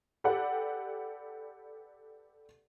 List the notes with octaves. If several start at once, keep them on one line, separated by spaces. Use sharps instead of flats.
G4 A4 B4 D5 F#5